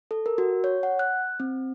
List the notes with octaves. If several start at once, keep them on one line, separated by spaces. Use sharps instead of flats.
A4
A#4
F#4
C#5
F#5
F#6
C4